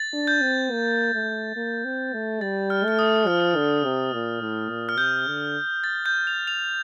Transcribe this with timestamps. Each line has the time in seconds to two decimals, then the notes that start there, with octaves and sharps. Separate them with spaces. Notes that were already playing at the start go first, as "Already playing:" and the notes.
Already playing: A6
0.13 D4
0.27 G6
0.42 C4
0.71 A#3
1.14 A3
1.56 A#3
1.85 C4
2.13 A3
2.41 G3 A6
2.70 F6
2.85 A3 F6
2.99 D#6
3.27 F3 F6
3.56 D3
3.85 C3
4.13 A#2
4.41 A2
4.70 A#2
4.89 F6
4.98 C3 G6
5.27 D3
5.84 A6
6.06 G6
6.27 F7
6.47 F7